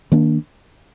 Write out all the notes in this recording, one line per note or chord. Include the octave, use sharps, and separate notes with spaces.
D#3 A#3 D4